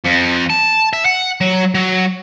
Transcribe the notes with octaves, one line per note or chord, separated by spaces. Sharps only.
F2
A5
E5
F#5
F#3
F#3